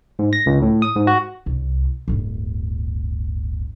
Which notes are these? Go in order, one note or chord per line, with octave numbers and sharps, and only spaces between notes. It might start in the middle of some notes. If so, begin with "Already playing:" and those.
G#2
A#6
C#2
A2
D#6
G#2
F#4
C2
D1 G1